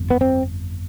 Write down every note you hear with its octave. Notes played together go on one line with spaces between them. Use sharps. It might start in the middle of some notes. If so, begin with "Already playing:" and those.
Already playing: G1 F2
B3
C4